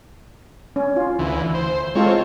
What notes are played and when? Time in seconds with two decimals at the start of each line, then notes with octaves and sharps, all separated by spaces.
0.76 C#4
0.96 F4
1.19 D2 E3
1.54 C5
1.95 G#3 C4 F4 A4 C#5